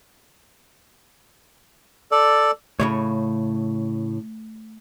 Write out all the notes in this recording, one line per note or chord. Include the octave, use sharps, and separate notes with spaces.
A4 D5
A2 C#3 A3 C#5